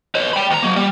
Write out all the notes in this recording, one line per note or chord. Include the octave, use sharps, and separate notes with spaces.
B4 C#5
G5 B5
D2 A#5
F#3 A#3
G3